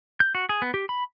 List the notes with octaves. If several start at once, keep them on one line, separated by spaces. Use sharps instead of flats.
G6
F#4
G#4
B3
G4
B5